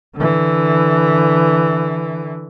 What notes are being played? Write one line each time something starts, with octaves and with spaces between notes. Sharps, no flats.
D3 E3